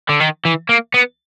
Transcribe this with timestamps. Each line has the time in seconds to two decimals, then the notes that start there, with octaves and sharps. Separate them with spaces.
0.09 D3
0.20 D#3
0.45 E3
0.69 A#3
0.94 B3